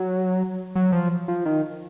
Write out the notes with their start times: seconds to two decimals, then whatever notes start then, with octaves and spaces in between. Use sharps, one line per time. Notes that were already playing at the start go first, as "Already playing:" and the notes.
Already playing: F#3
0.75 F#3
0.92 F3
1.28 F3
1.45 D#3